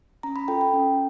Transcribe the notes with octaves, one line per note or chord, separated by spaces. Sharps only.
C#4 A#5
B5
F4 A4 G5
G5
C#4